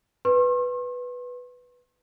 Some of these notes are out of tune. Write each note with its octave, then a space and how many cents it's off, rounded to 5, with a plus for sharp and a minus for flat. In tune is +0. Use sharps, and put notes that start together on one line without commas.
B4 +0 C6 +45